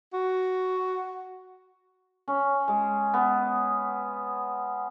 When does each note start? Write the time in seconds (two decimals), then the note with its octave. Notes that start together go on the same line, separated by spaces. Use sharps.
0.14 F#4
2.28 C#4
2.68 G#3
3.14 B3